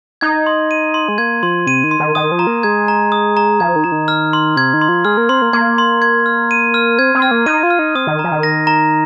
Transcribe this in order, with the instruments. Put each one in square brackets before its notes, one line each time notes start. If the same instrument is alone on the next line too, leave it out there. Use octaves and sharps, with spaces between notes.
[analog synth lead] D#4 [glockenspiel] G#6
[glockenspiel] C6
D#7
C6
[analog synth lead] G#3
[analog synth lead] A#3 [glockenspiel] G#6
[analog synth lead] F3 [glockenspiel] C6
[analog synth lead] C3 [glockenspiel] D#7
[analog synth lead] D#3
[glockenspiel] C6
[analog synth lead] D#3
[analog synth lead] D#3 [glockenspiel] D#6
[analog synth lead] F3
[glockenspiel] A#5
[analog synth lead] A#3
[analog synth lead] G#3 [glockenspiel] G#6
[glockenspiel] A#5
D#6
A#5
[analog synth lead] F3 [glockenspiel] G#6
[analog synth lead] D#3
[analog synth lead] F3 [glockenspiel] A#5
[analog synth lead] D#3
[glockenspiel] F6
C6
[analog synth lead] C3 [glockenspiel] G#6
[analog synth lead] D#3
[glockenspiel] C6
[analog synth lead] F3
[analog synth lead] G#3 [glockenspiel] F6
[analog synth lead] A#3
[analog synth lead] C4 [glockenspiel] C6
[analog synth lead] A#3
[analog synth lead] A#3 [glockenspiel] G#6
[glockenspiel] C6
G#6
F6
D#7
F6
[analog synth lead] C4 [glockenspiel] G#6
[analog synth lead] C4
[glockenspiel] F6
[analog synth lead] A#3
[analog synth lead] D#4 [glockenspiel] D#7
[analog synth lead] F4
[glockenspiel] F6
[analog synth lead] D#4
[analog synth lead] C4 [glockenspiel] D#6
[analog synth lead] D#3
[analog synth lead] F3 [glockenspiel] A#5
[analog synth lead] D#3
[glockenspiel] A#6
A#5